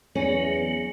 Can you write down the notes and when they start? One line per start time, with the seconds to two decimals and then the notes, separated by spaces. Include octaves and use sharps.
0.15 E2 F#3 B3 C#4 G#4 D5